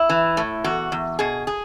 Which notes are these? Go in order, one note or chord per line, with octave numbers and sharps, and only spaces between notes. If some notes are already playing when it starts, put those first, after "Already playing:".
Already playing: E4
E3
A2
E2 F#4
E2
B2 G#4
G#4